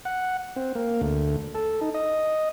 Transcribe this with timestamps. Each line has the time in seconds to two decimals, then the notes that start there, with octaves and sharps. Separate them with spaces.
0.05 F#5
0.56 C4
0.75 A#3
1.01 D2
1.55 A4
1.81 D#4
1.94 D#5